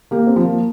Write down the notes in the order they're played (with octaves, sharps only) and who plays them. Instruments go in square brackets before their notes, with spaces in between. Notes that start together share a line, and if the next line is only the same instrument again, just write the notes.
[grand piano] A#3 [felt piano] G4
[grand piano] C4
[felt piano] F3
[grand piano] A#3